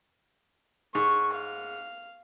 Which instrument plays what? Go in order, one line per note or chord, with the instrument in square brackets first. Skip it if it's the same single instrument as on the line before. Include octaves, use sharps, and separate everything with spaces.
[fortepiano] G#2 [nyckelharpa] C#6
[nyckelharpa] F5